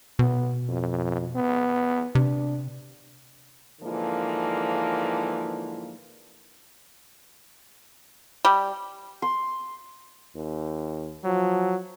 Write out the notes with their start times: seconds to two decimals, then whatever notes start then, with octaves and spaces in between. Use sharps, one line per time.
0.19 B2 B3
0.69 F2
1.36 B3
2.15 C3 D4
3.81 G#2 D3 E3 F3 A#3
8.45 G3
9.22 C6
10.35 D#2
11.24 F3 F#3